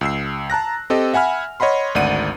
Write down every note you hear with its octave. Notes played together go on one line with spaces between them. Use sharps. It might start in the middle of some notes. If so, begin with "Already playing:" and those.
C#2 E6 C7
A5 A#5 F#6 A#6
C4 G4 A4 D#5
E5 F#5 G#5 B5 F6
C#5 D#5 F#5 B5 C6
G#1 D2 D5 F#5 D#7